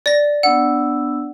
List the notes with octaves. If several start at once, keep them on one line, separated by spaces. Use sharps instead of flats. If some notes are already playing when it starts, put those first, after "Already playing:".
D5 A#6
B3 D4 F#5 E6